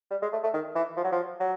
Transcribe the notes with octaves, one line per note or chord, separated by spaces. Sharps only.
G3
G#3
A3
A3
D#3
E3
F3
F#3
F3
F#3